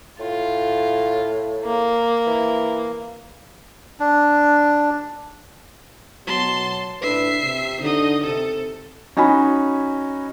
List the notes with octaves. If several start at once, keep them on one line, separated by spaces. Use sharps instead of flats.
A2 F4
A#3
E3
D4
B2 F#3 A5 C6
A2 D4 B4 E5 C7
C3
D3 D#4 D#5
C3 A4
C#4 D#4 F#4 G#5 B5